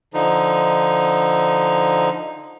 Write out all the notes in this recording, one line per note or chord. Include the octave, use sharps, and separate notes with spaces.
D3 F3 D#4